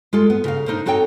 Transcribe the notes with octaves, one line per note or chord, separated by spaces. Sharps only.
G#3 F4 A4
B3
C#3 A#4 F5
D4 D#4 A4 A#4 C5
C4 D#4 F#4 A4 C#5 G5